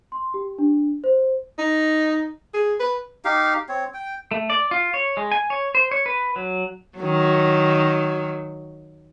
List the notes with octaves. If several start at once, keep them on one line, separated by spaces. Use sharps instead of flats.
C6
G4
D4
C5
D#4
G#4
B4
D#4 G4 F5
C4 C#5
G5
A3
D5
F4
C#5
G#3
G#5
C#5
C5
C#5
B4
F#3
D#3 F#3